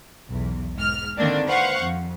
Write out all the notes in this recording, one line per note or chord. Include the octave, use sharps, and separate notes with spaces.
B1 E2
G#2 F6
D3 D#3 A#3 C4 D4
B4 C5 F5 F#5 C#6
F2